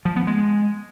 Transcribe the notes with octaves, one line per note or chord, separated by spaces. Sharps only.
F3
B3
G#3